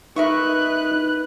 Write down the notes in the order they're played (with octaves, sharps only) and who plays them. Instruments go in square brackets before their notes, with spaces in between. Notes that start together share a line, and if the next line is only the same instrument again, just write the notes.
[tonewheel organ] D#4 [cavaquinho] A#4 E5 C#6 [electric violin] B4 F#6